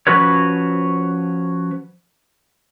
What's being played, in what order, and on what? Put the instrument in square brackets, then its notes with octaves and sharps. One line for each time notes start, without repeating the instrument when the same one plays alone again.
[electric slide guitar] F3 C#4 F#4 B4 C#5